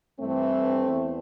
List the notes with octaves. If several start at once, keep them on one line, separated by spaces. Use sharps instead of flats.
G2 E3 A3 C4
E2